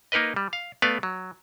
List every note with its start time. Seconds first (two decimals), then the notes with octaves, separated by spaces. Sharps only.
0.12 A#3 D#4 A#4 B4 D#5
0.36 G3
0.53 F5
0.82 A3 B3 B4 D5 F5
1.03 F#3